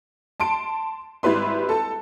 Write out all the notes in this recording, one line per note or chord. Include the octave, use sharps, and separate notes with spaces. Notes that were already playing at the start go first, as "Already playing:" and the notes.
A5 C6 D7
G#1 G3 E4 B4 C6
A4 A5